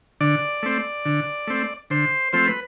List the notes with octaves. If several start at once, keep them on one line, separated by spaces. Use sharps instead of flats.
D3 D5
A3 C4
D3
A3 C4
D3 C5
F3 A3 C4 C5
B4